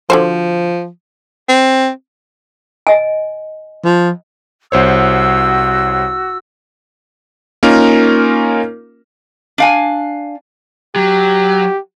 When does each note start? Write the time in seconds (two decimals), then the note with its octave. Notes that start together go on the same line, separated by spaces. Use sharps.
0.10 D3 F3 F#4 C5
1.49 C4
2.87 D#5 G#5
3.85 F3
4.72 C2 F#4 C5 C#5 E6
7.63 A#3 C#4 D#4 F4 A#4
9.58 D4 F5 G#5
10.96 F#3 G4